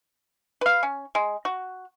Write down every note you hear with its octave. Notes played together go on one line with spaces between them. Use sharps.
B4 F5
C#4
G#3
F#4